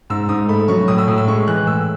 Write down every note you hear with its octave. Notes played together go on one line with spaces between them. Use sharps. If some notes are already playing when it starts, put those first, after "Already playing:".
G#2 E6
G#2 D#6
A3 B5
F#3 C#6
A2 D#6
E6
A2 D#6
E6
G#3 C#6
E3 F#6
A2 E6